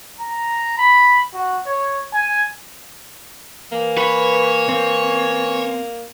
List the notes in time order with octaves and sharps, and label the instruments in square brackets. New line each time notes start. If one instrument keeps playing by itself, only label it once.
[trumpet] A#5
B5
F#4
C#5
G#5
[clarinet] E3 [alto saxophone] A#3
[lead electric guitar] B4 [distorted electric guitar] C#5
[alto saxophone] A#3 [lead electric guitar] C4